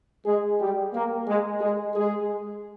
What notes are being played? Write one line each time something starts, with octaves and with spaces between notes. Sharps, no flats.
G#3 G#4
G3 G4
A#3 A#4
G#3 G#4
G#3 G#4
G#3 G#4